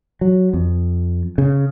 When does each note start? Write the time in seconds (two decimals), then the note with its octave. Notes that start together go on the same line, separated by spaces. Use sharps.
0.21 F#3
0.53 F2
1.38 C#3